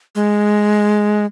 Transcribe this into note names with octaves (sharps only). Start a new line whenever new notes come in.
G#3